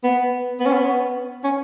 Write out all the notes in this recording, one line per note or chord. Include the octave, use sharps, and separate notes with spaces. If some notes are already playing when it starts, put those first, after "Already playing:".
B3
B3
C#4
B3
C#4